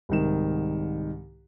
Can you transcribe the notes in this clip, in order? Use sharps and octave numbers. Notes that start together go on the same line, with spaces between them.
C2 G#2 D#3 E7